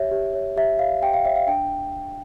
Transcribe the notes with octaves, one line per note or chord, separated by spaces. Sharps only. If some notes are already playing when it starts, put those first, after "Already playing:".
Already playing: G4 C#5 E5
G4
C#5
G4 E5
C#5 F5
G4 G5
F5
C#5 E5
F5
D4 G5